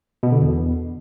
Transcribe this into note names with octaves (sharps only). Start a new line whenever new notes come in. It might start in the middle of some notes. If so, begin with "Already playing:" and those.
B2
D3
E2